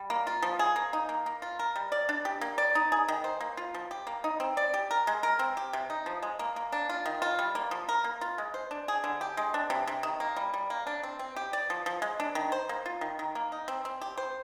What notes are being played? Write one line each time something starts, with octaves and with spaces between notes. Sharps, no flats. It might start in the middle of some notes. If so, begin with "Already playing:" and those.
Already playing: G3
A#3
F4
F3
G#4
A#3
D#4
A#3
A#3
F4
A#4
G3
D5
D4
G4
A#3
D5
D#4
G#4
D#3
C5
A#3
F4
F3
G4
A#3
D#4
C4
D5
G4
A#4
G#3
A#4
C4
G4
C3
D#4
F3
G#3
A#3
A#3
D4
F4
D#3
F4
G3
A#3
F3
A#4
A#3
F4
G#3
C5
D4
G#4
D3
G4
G#3
D4
C3
C3
D#3
A#3
G3
G3
A#3
D4
C4
C4
G4
D5
F3
F3
G#3
D4
D#3
C5
A#3
F4
D#3
D#3
A#3
D#4
C4
C4
G4
C5